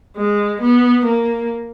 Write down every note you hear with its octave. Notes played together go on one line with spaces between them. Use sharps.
G#3
B3
A#3